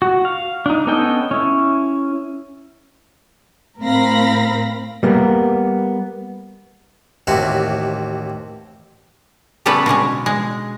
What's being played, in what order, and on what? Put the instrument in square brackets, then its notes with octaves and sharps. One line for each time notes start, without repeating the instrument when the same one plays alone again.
[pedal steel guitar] F#4
F5
D4 D#4
B3 C#4 A4 D#5 G5
C#4 E4
[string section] A2 C4 A#4 F5 B5 A#6
[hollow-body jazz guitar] G3 A#3 B3
[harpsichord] A1 D#2 C3 E4 F#4 C6
[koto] C#3 G3 B3 C#4 A4 B4
B2 D3 G#3 C#4
G#3